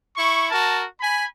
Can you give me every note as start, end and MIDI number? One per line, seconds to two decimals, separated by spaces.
0.16 0.49 64
0.16 0.49 85
0.50 0.84 66
0.50 0.84 70
0.50 0.84 81
1.01 1.25 80
1.01 1.25 83